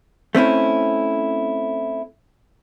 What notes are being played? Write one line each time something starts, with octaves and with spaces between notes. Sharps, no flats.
A3 C4 C#4 E4